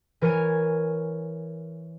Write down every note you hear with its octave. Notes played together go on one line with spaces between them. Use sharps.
E3 A#4 C#5 G#5 G#6